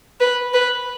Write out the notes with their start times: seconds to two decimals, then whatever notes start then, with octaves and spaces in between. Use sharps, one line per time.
0.20 B4
0.54 B4